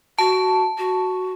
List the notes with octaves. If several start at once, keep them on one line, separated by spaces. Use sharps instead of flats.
F#4 A5
F#4